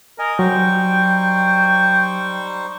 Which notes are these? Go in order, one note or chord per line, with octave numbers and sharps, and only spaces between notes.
A#4 D#5 G#5
F#3 G3 D#4 C5 G5 C#6